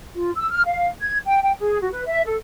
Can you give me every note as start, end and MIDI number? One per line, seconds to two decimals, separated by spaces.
0.16 0.31 65
0.35 0.50 88
0.51 0.62 89
0.65 0.87 77
1.01 1.17 92
1.26 1.42 79
1.42 1.53 79
1.59 1.78 68
1.81 1.90 66
1.93 2.04 71
2.07 2.22 76
2.25 2.35 69